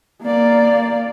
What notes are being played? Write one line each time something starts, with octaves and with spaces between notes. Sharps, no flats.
A#3 D5